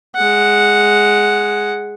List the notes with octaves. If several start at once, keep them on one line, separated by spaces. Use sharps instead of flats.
G#3 F#5